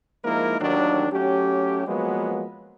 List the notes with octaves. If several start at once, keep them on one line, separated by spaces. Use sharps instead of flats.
F3 G#3 A#3 D#4 E4 A#4
A1 D#2 D#3 F#3 D4
F#3 A3 C#4 G4
F3 F#3 G#3 A#3 B3 B4